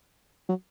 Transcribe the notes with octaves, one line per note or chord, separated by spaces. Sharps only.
F#3